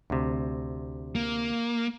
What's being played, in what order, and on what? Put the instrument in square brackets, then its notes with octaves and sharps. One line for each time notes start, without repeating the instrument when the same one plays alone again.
[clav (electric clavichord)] D2 C3
[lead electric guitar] A#3